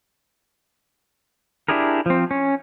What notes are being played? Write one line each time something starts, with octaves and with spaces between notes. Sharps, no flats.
D4 E4 G4 G#4 A#4
F3 C4
C#4